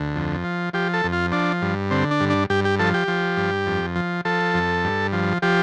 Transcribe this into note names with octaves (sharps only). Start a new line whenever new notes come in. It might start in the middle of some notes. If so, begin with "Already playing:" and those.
Already playing: D2
F2
F3
F3 G4
A4
F2
F4
F3 D4
G2
D3 C4
D4
G2
D4
G2 G4
G4
F3 A4
G4
F3
G2
F2
F3
F3 A4
F2
G2
F3
F3 G4